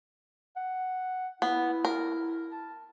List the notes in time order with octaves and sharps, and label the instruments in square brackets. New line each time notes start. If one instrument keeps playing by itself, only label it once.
[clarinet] F#5
[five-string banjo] B3 [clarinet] E4
[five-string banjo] A#4
[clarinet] A5